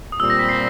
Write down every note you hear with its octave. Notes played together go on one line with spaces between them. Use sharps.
D#6
A#2 G3 C4 E6
A#6
B6
C7